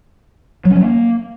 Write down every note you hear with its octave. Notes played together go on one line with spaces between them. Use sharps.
F#3
C#4
F#3
A#3